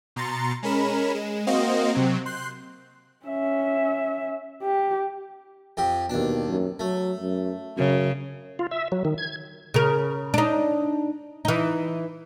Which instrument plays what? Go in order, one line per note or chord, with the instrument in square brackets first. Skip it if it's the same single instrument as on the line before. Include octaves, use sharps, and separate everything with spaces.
[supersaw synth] B2 A#5 C6 A6 C#7
G#3 C#4 A#4 B5 E7
G#3 E7
A#3 C4 F#4 C5 D#5 F5
C3 F#3 C4
C6 F#6 G6 C7
[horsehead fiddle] C#4 E5
G4
[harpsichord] F2 G4
[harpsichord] D#2 D4 [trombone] B2
[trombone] F#2
[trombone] F#3 [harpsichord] A3
[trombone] F#2
[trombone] F#2 [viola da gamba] C#3
[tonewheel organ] F4
E5
F#3
D#3
G#6
[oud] C#3 A#4
D4 D#4
E3 D#4